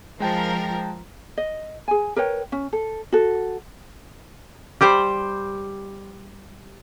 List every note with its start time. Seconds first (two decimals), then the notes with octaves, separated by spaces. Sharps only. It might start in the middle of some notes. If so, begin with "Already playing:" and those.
0.20 F3 G#3 A#4 G5 A5
1.37 D#5
1.88 G#4 G#5
2.16 A#4 B4 C#5 G5
2.52 C#4
2.73 A4
3.12 F#4 A4
4.81 G3 G4 C5 G5